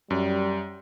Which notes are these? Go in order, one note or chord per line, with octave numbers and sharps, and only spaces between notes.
F#2 G3